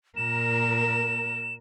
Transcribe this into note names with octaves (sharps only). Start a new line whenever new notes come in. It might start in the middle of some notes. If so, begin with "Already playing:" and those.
A#2 A#4 E7